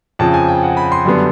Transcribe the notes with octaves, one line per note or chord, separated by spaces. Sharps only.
F2 C#3 F3 A5
G#5
G5
F#5
B5
C6
F#2 D3 G3 B3